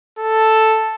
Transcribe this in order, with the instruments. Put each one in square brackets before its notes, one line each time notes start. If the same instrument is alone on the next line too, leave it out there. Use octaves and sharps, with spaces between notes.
[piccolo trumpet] A4